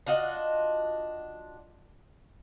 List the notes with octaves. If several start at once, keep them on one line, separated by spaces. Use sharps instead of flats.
D4 F4 F#4 D#5